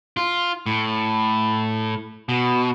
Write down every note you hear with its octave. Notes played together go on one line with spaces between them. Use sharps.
F4
A2
B2